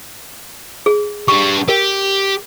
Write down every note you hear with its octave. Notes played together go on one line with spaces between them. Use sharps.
G#4
G3 D4 C#6
G4 A#4